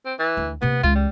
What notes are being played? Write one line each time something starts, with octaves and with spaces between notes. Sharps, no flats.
C4
E3
D2
C3 A#3 B3
C#2 E3 F4
G3